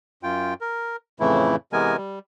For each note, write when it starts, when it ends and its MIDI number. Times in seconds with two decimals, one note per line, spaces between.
0.23 0.54 42
0.23 0.54 65
0.23 0.54 79
0.61 0.96 70
1.20 1.56 41
1.20 1.56 45
1.20 1.56 49
1.20 1.56 52
1.20 1.56 57
1.20 1.56 64
1.73 1.97 48
1.73 1.97 52
1.73 1.97 56
1.73 1.97 59
1.73 1.97 70
1.73 1.97 80
1.97 2.19 55